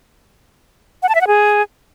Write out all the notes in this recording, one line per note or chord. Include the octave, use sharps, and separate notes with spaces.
F#5
A5
E5
F#5
G#4